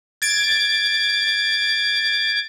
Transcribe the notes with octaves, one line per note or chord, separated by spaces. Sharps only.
G#6 A6 D7